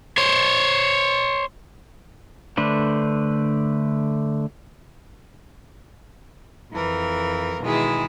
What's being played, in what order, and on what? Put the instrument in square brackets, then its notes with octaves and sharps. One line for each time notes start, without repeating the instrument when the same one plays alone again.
[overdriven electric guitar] C5 C#5
[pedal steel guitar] D3 A3 D4 B4 C5
[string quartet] F2 E3 A#4
B2 D#3 E3 G#3 E4 G#4